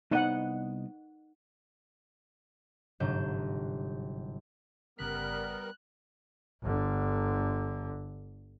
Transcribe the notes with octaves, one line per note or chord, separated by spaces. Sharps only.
C2 B3 D#4 D#5 F#5
G1 G#2 C3 F#3 G6 E7
G1 C#3 G3 B3 A#4 F#6 B6
G1 D3